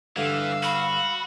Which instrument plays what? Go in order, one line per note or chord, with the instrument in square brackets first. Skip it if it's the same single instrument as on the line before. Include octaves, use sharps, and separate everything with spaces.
[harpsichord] G2 D3 [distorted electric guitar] E3 [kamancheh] F5 E6
[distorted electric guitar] F#4 [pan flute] B5